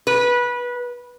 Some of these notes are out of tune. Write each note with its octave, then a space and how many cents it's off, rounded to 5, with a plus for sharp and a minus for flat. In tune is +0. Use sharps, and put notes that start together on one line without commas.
B4 -20